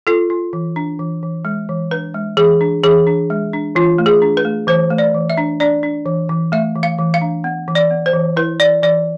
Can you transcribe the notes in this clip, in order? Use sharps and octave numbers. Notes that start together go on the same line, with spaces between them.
F4 A4
F4
E3
D4
E3
E3
G#3
E3
D4 B4
G#3
E3 G#4
D4
E3 G#4
D4
G#3
D4
E3 F4
A3
G#4
D4
B4
A3
E3 C5
A3
D5
E3
E5
D4
D4 D5
D4
E3
E3
A3 E5
E3
F5
E3
F5
D4
B3
E3
D5
B3
C5
E3
E4 B4
E3 D5
E3 D5